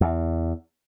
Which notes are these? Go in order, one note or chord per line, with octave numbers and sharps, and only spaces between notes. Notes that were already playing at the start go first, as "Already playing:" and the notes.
E2